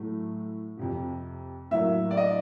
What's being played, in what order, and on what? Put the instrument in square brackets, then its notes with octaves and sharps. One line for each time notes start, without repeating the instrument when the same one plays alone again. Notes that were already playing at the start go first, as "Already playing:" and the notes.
Already playing: [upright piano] A2 F#3 A3
F2 C3 F3
[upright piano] A2 F#3 A#3 [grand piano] E5
[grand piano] D5
D#5